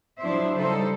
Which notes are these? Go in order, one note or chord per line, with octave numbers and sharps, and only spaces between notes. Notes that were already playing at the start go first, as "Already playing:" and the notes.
F3 F#3 D4 E4 C5 E5
C#3 G3 D#4 A4 C5